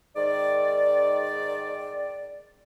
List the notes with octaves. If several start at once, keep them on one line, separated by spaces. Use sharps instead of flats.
G#2 D#3 D5